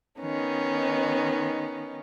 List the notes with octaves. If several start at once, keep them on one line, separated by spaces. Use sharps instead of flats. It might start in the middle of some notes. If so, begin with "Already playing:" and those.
D#3 B3 C#4 D#4